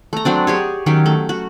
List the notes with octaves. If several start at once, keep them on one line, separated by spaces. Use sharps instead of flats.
A3 A#5
F#3 C4 D4
G4 G#4 C#5
D#3 F#3 C#4 G4
A3
F#4